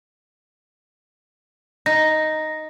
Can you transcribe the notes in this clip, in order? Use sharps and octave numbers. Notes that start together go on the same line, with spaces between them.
D#4 A#6